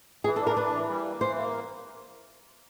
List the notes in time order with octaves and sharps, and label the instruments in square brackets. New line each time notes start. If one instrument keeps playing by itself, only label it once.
[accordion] E3 [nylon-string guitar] G#4
[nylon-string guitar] A4
[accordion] D4
[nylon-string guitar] A#4
[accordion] E3 [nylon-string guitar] B4
[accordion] E3
G3
A#3
[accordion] E3 [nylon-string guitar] C5
[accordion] A#3